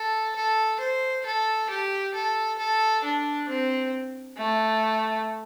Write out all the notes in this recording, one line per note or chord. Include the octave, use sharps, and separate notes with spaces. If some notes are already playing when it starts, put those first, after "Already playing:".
Already playing: A4
A4
C5
A4
G4
A4
A4
D4
C4
A3